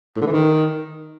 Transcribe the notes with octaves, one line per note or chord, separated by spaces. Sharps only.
A2
D3
E3
D#3